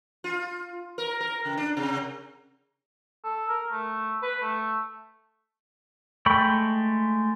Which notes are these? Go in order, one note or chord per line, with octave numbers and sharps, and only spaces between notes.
F4
A#4
A#4
C#3
D4
C3
A4
A#4
A3
B4
A3
G#3 A3 G5 B5 C#6